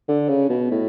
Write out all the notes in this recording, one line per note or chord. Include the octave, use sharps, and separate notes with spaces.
D3
C#3
B2
A2